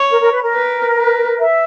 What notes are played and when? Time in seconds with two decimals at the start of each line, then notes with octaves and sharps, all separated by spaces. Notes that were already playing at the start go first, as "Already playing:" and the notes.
Already playing: C#5
0.10 A#4
0.20 A#4
0.31 B4
0.42 A#4
0.53 B4
0.97 B4
1.40 E5